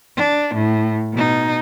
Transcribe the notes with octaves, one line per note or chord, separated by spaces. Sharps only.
D4
A2
B2 D#4